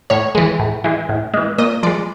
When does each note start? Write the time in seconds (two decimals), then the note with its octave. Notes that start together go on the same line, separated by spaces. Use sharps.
0.10 A2 C#5
0.35 E3 G#3
0.59 A2
0.84 E3 G#3
1.09 A2
1.34 E3 G#3
1.58 A#2 D#5
1.83 F3 G#3 D5